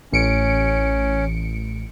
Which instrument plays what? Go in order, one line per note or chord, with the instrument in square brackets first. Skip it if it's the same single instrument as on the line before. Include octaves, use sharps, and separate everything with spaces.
[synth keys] A1 C#7 D7 [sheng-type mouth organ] C#4